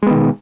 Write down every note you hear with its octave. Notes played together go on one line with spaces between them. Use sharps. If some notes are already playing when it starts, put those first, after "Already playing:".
B2 D#3 G#3 B3